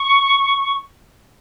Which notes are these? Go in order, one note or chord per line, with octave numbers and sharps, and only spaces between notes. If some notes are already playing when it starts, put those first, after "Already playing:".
Already playing: C#6